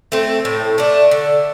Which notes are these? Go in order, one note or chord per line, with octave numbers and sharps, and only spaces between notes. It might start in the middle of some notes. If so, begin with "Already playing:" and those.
A3 C4
A2
A3 D4
D3